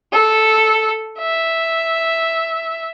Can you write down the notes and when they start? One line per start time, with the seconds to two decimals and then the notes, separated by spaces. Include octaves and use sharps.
0.12 A4
1.19 E5